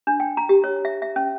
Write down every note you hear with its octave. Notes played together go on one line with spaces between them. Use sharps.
D4
G5
A#5
G4
C#5
E5
E5
C#4